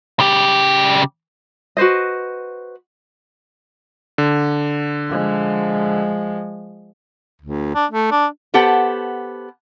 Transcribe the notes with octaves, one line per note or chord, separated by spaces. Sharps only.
C#3 G4
F#4 B4 C5 D#5
D3
F3 G#3
D2
D4
A3
D4
B3 G4 A4 C5 F#5